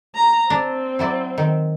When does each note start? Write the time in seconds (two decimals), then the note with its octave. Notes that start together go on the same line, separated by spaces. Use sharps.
0.15 A#5
0.50 C4 D4
0.99 F#3 E4 D5
1.38 D#3